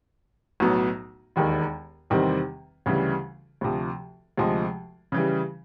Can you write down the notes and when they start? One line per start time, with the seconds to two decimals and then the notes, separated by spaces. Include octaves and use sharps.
0.60 B1 A2 F#3 B3
1.36 E1 D#2 D#3
2.10 E2 C3 D#3 G3 C4
2.86 D2 C#3 E3 G3
3.61 D2 C3 F3
4.37 D2 C3 F3 G#3
5.12 C#3 E3 G3